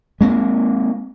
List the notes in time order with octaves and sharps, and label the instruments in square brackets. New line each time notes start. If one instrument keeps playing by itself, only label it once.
[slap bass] G#3 A#3 C4